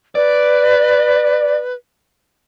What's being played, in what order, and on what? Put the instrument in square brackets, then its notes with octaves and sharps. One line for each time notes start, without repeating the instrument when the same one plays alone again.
[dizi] B4 [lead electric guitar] D5